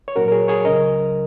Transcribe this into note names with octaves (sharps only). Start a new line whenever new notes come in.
C#5
A#2 F#3 C#4 F#4 A#4
A#4
G#4 C#5
G#4 C#5
C#2 C#3 F#3 C#4 A#4 D#5